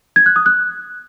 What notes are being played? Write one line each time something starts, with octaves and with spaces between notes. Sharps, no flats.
G#6
F#6
D#6
F#6